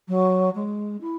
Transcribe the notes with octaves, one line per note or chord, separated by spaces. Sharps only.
F#3
G#3
E4